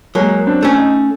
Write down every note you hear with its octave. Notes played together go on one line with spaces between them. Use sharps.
F#3 G#3 A#3
C4 D4
A3 C#4
D#4